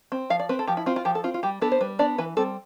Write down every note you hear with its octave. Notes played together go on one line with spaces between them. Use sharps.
C4
F3 F5
D5
C4 B4
A4
F3 G4
E4
C4 F4
F4
F3 G4
A4
C4 F4
F4
G3 G4
B3 D4 A4
C5
G3 B4
B3 D4 D5
E3 B4
G3 C4 A4